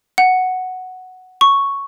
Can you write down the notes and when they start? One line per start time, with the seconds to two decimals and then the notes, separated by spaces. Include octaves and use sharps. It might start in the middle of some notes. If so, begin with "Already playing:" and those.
0.18 F#5
1.41 C#6